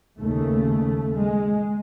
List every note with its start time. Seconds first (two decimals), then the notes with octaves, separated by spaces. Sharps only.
0.18 D#2 C#3 A3
1.12 G#3